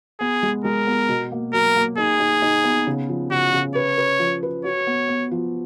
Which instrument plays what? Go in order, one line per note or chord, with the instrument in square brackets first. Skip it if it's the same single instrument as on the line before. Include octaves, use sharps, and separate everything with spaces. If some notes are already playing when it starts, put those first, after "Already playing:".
[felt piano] B3 [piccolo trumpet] G#4
[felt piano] G#3
[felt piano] G#3 [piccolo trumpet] A#4
[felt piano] B3
B2
A#3
[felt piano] F#3 [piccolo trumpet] A#4
[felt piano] A#3
[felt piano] D#4 [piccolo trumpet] G#4
[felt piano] D#4
D#4
B3
C#3
F3
[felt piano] C#3 [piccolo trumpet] F#4
[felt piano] C#3
[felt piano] B4 [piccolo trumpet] C#5
[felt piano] B4
F3
B4
[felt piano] F#4 [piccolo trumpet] C#5
[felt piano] B3
B3
F3